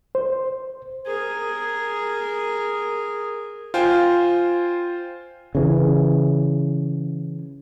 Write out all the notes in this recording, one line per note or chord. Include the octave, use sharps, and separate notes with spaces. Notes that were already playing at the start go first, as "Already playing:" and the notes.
C5
G#4 A#4
F4 C5 G5 G#5
C#3 E3